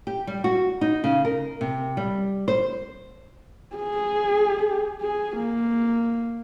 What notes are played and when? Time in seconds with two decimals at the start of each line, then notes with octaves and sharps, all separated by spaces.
0.07 G4
0.27 G3
0.44 F#4
0.81 D#4
1.04 C#3
1.25 A#4
1.61 C3
1.97 G3
2.48 C5
3.76 G#4
5.01 G#4
5.38 A#3